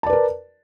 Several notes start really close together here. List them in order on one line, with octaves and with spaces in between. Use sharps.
A5 D5 B4 A#4